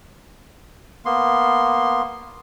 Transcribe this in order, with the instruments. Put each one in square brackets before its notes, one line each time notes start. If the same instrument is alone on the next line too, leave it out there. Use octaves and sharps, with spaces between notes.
[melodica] A#3 B3 C6